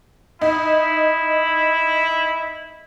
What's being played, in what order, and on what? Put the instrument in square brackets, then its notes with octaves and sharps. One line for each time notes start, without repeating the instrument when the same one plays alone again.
[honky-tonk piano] D#4 [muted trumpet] E4